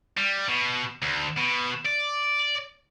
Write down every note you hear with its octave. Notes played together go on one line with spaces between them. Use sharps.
G3
B2
D2
B2
D5